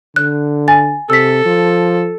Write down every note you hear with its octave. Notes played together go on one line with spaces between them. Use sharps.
D3 F#6
G#5 A6
C3 A4 E6 B6
F3